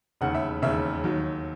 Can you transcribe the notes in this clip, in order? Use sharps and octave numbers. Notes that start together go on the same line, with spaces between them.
E1 D#2 C#3 F#5
E5
E1 D#2 C#3 E5
D#2 D#3 F#3